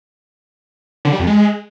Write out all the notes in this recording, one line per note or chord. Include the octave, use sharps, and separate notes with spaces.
D3
G3
F2
G#3